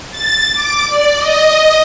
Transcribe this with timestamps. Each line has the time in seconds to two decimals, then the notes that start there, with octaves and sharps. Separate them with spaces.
0.11 A6
0.54 D6
0.87 D5
1.17 D#5